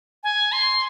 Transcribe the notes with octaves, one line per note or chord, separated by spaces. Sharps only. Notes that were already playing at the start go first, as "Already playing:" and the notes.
G#5
C6